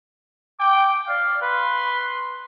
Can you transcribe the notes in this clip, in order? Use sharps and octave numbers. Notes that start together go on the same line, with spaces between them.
G5 D6
D5 F5
B4 C6